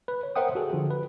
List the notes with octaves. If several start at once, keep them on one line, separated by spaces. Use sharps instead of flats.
B4
C#5
A#4 C5 E5 F#5 G5 D#6
F#4 G#4 A4
D3 F3
B4